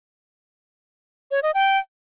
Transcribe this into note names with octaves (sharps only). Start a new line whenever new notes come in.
C#5
D#5
G5